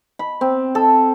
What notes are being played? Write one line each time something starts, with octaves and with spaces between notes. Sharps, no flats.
B5
C4
A4